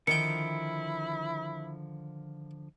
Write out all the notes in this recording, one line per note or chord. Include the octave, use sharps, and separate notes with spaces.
D3 D#3 F3 E4 G5 C#7